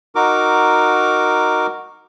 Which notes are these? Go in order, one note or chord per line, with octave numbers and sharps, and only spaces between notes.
D#4 F#4 A#4 D6